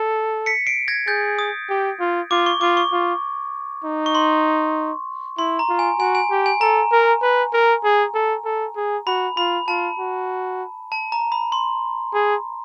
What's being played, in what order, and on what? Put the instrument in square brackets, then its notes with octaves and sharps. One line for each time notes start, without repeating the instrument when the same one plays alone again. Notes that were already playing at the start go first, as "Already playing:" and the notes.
Already playing: [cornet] A4
[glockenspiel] B6 C#7
C7 D7
G#6 A#6
[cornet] G#4 [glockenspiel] G6 A6
[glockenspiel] D#6
[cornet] G4
F4
[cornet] F4 [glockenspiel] D6
[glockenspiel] C#6
[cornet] F4 [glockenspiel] D6
[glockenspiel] C#6
[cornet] F4
D#4
[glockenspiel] C#6
C6
[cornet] E4 [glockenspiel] C6
[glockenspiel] A#5
[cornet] F4
[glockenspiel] G#5
[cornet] F#4 [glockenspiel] G#5
[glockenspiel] G#5
[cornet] G4
[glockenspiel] G#5
[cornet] A4 [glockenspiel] A#5
[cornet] A#4
B4
A#4
G#4
A4
A4
G#4
[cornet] F#4 [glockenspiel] B5
[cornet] F4 [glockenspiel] B5
[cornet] F4 [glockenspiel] A5
[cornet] F#4
[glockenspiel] A5
A#5
B5
C6
[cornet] G#4